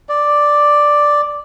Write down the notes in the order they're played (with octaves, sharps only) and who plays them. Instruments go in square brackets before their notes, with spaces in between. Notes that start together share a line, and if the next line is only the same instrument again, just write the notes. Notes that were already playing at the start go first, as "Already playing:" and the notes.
[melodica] D5